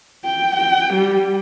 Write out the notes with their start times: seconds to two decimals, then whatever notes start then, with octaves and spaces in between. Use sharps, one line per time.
0.25 G5
0.56 G5
0.93 G3